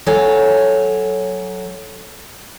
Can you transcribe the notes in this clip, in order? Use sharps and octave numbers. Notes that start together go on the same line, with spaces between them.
F#3 A4 C#5 G#5